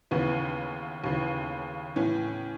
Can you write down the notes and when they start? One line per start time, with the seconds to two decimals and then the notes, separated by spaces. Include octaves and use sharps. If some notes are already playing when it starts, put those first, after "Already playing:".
0.11 D#2 C#3 E3 B3
1.04 D#2 C#3 E3
1.96 A2 E3 C#4